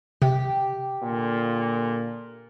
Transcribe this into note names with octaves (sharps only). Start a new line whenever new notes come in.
C3 G4
A#2 D3